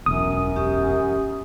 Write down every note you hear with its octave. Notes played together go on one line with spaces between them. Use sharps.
E1 B1 F#2 D#6
C#4 G4